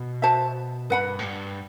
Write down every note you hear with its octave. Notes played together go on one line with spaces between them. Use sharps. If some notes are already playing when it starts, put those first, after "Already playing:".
Already playing: B2
F#4 C5 E5 A5
G2 B4 F#5 B5
A2
G2